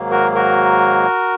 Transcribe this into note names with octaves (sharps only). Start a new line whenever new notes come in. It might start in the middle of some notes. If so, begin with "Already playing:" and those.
Already playing: G#2 D#3 F#3 A#3
F#4 A#4
F#4 A#4